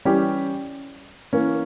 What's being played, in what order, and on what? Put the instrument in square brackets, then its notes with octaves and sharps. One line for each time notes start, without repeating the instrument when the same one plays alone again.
[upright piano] E3 G3 C#4 G4
E3 A#3 C#4